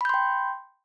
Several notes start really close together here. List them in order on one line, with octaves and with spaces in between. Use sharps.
B5 G6 C6 G5